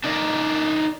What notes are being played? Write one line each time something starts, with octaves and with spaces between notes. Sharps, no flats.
D4 D#4 A#4 D5 D#5